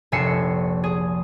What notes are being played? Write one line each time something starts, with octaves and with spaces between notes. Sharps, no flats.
F1 A#1 E5 G#5 C7 C#7
G#4